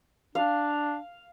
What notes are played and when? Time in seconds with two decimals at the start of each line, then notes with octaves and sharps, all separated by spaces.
0.35 D4 F5